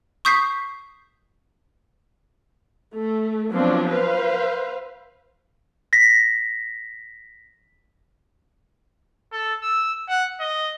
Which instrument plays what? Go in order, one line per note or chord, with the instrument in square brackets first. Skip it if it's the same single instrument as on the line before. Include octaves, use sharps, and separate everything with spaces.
[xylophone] C#6 D#6 G6 B6 C7
[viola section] A3
F3 F#3 B3 C4 D4
B4 C5 F5
[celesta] A#6 B6
[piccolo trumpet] A4
E6
F#5
D#5